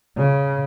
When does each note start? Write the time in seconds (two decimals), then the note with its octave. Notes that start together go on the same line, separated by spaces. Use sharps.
0.17 C#3